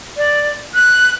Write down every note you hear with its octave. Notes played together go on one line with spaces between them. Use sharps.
D5
F#6